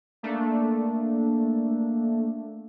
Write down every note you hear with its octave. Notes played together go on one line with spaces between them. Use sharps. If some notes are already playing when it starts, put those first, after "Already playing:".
A3 A#3 D4